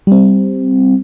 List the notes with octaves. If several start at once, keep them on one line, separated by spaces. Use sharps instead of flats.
G3 C4